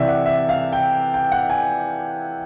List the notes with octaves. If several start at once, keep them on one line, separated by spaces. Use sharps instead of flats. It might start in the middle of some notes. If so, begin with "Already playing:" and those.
Already playing: C3 E3 D5 E5
F#5
E5
F5
G5
G5
F#5
G#5